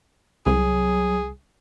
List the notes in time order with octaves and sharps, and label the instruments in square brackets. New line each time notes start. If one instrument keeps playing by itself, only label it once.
[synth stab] C2 [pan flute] F#3 [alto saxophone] G#4